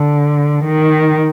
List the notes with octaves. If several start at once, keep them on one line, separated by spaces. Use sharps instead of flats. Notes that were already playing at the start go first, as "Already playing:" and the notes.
Already playing: D3
D#3